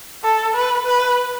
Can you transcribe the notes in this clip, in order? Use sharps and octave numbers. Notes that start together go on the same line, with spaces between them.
A4
B4
B4